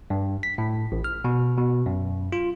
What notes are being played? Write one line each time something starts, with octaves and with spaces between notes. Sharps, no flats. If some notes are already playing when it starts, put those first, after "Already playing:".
G2
B6
A2
A1
F6
B2
B2
F#2
F4